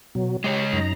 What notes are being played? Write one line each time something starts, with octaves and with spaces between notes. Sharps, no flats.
B2 F#3
G#3 G4 C#5
F#2 D#4 A#5